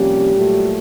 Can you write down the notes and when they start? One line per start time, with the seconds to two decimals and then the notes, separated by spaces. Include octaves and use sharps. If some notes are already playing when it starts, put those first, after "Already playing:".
Already playing: C3 F3 G3 A#3 C#4 G4
0.35 A#2 F#3 A3